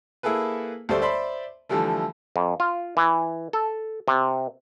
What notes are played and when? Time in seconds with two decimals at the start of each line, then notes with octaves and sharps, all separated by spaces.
0.23 A#3 E4 G#4 A4 B4
0.89 D2 G3 A3 A4 C5 D5
1.02 C5 D5 E5 B5 C6
1.69 D3 E3 F3 G3 A3
2.36 F2
2.60 F4
2.97 E3
3.53 A4
4.08 C3